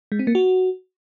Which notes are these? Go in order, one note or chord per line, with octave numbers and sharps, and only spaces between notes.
G#3
C4
A#3
F#4